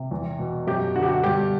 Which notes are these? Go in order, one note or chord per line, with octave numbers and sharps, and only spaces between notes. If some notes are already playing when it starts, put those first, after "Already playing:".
Already playing: C3
E2
B2
F#2 G4
D3 F#4
G4
F#4
G2 G4